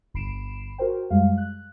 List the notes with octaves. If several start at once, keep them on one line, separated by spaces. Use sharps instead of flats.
G1 B5 C7 D7 E7
F#4 A#4 C5 G5
F#2 G3 G#3 F5
F#6